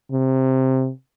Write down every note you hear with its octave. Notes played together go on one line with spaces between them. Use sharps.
C3